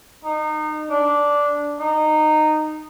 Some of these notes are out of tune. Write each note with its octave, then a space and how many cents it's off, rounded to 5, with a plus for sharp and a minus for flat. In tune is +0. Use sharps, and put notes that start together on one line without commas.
D#4 -25
D4 -10
D#4 -15